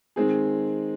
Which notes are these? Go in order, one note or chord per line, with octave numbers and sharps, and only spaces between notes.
D#3 G#3 C4 G#4